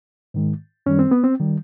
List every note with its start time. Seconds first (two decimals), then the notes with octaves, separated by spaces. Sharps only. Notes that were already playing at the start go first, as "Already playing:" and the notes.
0.34 G#2 D#3 G#3
0.86 F#2 D#3 G3 C#4
0.99 C4
1.11 B3
1.24 C4
1.39 D#3 G3